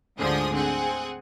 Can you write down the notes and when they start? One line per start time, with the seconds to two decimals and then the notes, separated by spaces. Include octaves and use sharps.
0.19 D2 G#2 D3 F3 G#4 D#6
0.54 C4 G#4 F#5